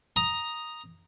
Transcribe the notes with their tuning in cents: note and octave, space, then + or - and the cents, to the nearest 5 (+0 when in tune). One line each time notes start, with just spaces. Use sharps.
A#5 +5 D#6 +0